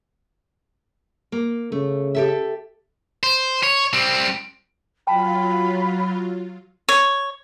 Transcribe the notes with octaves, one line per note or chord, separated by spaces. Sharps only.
A#3
C#3 A3
G4 A4 E5
C5
C#5
G3 C4
F#3 F4 G5 A5 B5
C#5